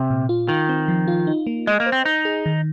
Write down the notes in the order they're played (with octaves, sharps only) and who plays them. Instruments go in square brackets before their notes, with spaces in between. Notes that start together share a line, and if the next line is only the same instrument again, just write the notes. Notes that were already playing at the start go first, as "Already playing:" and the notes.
Already playing: [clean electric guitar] C3
[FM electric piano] A#2
F4
[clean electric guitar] D#3 [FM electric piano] F4
[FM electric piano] C4
F3
F4
D#4
A#3
[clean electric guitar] G#3 [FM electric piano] D#5
[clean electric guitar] A#3
[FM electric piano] C5
[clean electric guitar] C4
[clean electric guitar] D#4 [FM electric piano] D#5
[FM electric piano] G#4
D#3